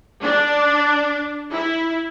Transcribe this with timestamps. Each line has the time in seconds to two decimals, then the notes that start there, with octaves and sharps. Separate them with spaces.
0.23 D4
1.52 E4